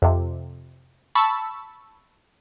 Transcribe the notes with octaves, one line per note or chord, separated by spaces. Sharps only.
F2 C3
A5 B5 C#6 E6